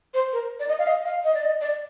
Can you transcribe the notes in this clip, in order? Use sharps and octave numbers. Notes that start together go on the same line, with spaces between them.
C5
A#4
D5
D#5
F5
D#5
F5
D#5
D5
D#5
D5